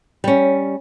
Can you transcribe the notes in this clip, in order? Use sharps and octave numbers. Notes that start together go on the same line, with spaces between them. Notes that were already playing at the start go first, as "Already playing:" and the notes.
G3 C#4